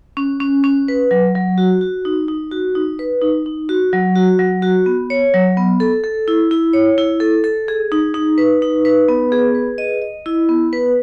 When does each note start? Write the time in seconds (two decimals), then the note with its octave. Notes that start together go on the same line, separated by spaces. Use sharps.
0.17 C#4
0.40 C#4
0.64 C#4
0.88 B4
1.11 F#3
1.35 F#3
1.58 F#4
1.81 F#4
2.05 D#4
2.28 D#4
2.52 F#4
2.75 D#4
2.99 B4
3.22 D#4
3.46 D#4
3.69 F#4
3.93 F#3
4.15 F#4
4.39 F#3
4.62 F#4
4.86 B3
5.10 C#5
5.34 F#3
5.57 B3
5.80 A4
6.04 A4
6.28 E4
6.51 E4
6.73 C#5
6.98 E4
7.20 A4
7.44 A4
7.68 G#4
7.92 D#4
8.14 D#4
8.38 B4
8.62 D#4
8.85 B4
9.08 B3
9.32 G#4
9.55 B4
9.78 D#5
10.02 D#5
10.26 E4
10.49 B3
10.73 B4